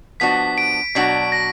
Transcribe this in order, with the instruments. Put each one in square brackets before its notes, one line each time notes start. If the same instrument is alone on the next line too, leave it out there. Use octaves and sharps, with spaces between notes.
[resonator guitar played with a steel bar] F3 B3 D4 F#4 [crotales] B6
[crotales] D7
[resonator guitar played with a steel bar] B2 F#3 D4 F#4 [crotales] B6
[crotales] A#6